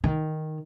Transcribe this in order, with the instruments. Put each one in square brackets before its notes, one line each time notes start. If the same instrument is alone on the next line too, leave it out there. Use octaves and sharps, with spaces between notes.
[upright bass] D#3